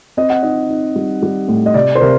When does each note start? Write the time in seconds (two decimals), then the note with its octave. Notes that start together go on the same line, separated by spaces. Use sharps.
0.17 C4 D#5
0.30 F#5
0.43 D#4 D#5
0.70 D#4
0.95 G3
1.22 G3
1.48 A2
1.66 D#5
1.74 C3 D5
1.95 C5
2.01 C3 A#4